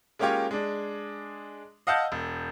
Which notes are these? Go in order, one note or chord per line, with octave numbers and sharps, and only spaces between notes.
G#3 A#3 C#4 F4 G4 C#5
G#3 D4
D#5 F5 F#5 A5 E6 G6
E1